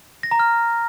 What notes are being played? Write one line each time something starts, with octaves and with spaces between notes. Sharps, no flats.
A#6
A#5
F6